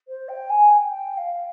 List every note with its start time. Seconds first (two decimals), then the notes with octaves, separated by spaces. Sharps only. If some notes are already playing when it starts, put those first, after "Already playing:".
0.08 C5
0.29 G5
0.50 G#5
0.70 G5
0.90 G5
1.17 F5